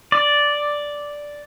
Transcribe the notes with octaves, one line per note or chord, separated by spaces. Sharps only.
D5